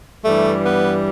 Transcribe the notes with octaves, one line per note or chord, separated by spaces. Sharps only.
G2 E3 G3 A3
B3